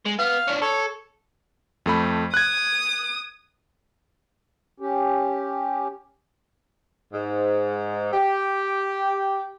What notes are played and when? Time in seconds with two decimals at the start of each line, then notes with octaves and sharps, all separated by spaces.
0.06 G#3
0.19 B3 F5
0.47 C#4 D4
0.62 A4 C#5
1.86 F2 A3 B5
2.34 D#6 F#6 G#6
4.80 C#4 G4
7.13 G#2
8.12 G4